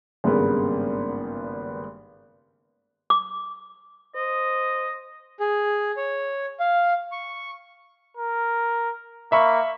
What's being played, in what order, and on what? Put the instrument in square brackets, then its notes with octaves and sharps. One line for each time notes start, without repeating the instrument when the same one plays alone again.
[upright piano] G#1 G2 C#3 G#3 A#3 B3
[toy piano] D6
[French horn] C5 [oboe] D#5
[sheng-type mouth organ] G#4
C#5
F5
C#6
[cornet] A#4
[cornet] A#3 [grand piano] E5 B5 C#6